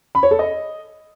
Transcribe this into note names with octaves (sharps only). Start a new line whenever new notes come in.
B5
C#5
A4
D#5